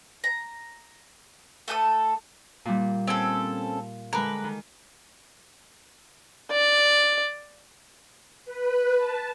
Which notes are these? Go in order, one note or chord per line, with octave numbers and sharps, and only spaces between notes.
A#5
A3 A4 G5 D#6
A#2 G3
C4 C#4 A4
D3 G#3 A#4 B4
D#3
D5
B4
A5